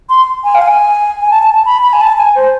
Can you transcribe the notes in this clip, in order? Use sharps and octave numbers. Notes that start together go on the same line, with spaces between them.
C6
G#5
F5
G#5
G#5
A5
A5
A5
B5
B5
G#5
A5
G#5
C5